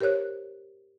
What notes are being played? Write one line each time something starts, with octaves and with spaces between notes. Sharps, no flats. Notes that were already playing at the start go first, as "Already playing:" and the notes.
G4 A#4 C5 C#5 F#6